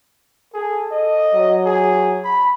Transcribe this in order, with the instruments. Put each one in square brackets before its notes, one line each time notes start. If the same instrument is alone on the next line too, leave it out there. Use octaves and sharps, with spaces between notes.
[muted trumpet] G#4 [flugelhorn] A4
[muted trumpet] D#5
[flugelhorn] F#3
[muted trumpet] G#4
B5